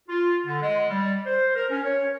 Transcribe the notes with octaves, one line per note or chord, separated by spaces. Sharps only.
F4
D3
G#3
G3
C5
A#4
C#4
C#5